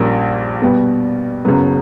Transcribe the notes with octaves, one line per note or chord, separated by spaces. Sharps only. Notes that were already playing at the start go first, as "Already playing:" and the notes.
Already playing: A#1 A#2 G3 A#3 C#4
B2 G3 B3
F#1 F#2 C#3 F#3 B3